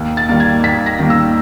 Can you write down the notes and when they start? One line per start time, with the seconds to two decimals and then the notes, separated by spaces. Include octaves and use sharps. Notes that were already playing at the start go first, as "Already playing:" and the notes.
Already playing: D#2
0.17 A6
0.29 D#3 G3 A#3
0.40 G#6
0.63 D#2 B6
0.86 A#6
0.99 D#3 G3 A#3
1.10 E6